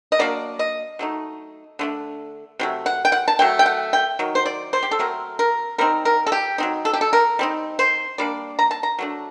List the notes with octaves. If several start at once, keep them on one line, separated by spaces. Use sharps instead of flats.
D#5
F#3 A#3 D4 D5
D#5
F#3 A3 D#4
D3 A3 D4
C3 F#3 A3
F#5
G5
F#5
A5
F#3 A3 G5
G5
F#5
G5
D#3 F#3
C5
D5
C5
G4
A4
C3 F#3 A3 C4 A#4
A#4
G3 C4 D#4 A#4
A#4
A4
G4
F#3 C4 D#4
A4
G4
A4
A#4
G3 C4 D#4
C5
G3 A#3 D4 D5
A#5
A5
A#5
F#3 A3 D4